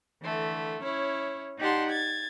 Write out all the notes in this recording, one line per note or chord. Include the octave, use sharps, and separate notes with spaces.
D3 E3 A3
C#4 E4 C#5
D#4 G4 D5 F#5 A5 C6
G#6 A6